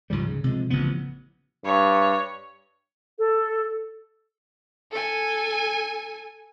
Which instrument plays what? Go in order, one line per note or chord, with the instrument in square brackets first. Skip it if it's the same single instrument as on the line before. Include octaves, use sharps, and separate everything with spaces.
[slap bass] C#2 G#2 F3 G3
C#3
C3 F3 G#3
A1 C#3 F3 B3
[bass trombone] G2 [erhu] C#5
[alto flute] A4
[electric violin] A4 G#5